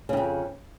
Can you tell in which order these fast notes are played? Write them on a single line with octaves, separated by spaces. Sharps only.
C#3 G#2 F2